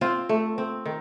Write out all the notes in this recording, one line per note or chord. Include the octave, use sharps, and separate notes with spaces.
C4 F4
A3
C4
D#3